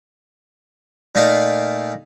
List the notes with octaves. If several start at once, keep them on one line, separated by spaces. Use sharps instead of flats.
A#2 A3 D#4 A#4 F5